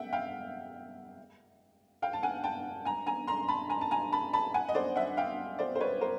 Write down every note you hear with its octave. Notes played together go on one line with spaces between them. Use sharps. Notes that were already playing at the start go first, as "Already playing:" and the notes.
Already playing: E5 F#5 G5
F5 G5
F5 G5
A5
F#5 G#5
G5 A5
G#5 A#5
G#5 A#5
A#5 C6
A5 B5
G#5 A#5
A5
G#5 A#5
A5 B5
A5 B5
F#5 G#5
D#5
C5 D5
E5 F#5
F5 G5
C5 D5
C5
B4 C#5
A#4 C5